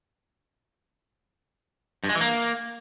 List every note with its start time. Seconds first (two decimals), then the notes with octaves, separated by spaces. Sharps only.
2.04 G2
2.09 G#3
2.15 E3
2.21 A#3